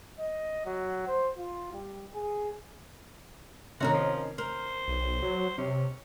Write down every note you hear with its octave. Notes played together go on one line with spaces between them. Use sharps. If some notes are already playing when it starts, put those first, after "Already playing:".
D#5
F#3
C5
F4
G3
G#4
C3 D#3 C#4 D#4 F#4 A#4
F3
A#4 C5
B1
F#3
C3 C#4